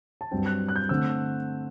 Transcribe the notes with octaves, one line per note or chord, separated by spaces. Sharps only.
A5
G2 F#3 C4 G5
F#6
F#6
G6
D3 A3 C4 E6